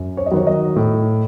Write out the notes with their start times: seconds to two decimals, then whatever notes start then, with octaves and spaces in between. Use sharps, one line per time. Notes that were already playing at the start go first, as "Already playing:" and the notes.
Already playing: F#2
0.17 C#5
0.26 D#5
0.31 D#3 F#3 C#5
0.47 D#5
0.76 A2